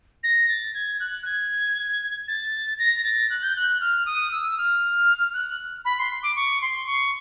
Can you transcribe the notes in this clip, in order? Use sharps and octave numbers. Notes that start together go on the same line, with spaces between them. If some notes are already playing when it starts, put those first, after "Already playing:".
A#6
A6
G#6
F#6
G#6
A6
A#6
A6
F#6
G6
F#6
F6
D#6
E6
F6
F#6
B5
C6
D6
C#6
C6
C#6